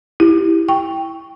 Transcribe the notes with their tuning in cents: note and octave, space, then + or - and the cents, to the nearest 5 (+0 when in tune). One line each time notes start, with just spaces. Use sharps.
E4 +0 G4 +0
G5 +0 C#6 +0